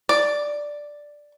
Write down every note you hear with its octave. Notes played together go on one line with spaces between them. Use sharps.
D5